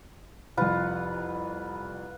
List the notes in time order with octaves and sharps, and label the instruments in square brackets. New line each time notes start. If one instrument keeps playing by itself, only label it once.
[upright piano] C2 F2 [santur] F4 B4 F#5